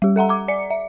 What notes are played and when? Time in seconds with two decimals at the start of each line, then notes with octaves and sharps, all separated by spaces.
0.02 G3 G4
0.16 A4 E5 F#5 A#5
0.29 A#5 D6
0.48 D5 C#7
0.71 E5